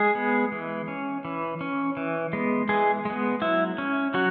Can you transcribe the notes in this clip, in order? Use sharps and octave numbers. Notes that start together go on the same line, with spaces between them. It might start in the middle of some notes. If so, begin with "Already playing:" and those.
Already playing: G#3 G#4
B3
E3
C#4
E3
C#4
E3
G#3 B3
E3 G#3 G#4
G#3 B3
F#3 E4
C#4
F#3 F#4